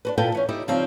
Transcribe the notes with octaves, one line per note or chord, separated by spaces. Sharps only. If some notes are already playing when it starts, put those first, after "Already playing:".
D4 F#4 B4
A#2 E4 A4 B4 G5 G#5
E3 C#4
D#4 E4 G4 D5
C#3 F3 G3 C4 D#4